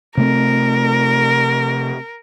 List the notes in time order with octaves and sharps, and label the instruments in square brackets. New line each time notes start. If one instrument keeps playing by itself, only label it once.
[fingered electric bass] C3 A3 C4 [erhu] A#4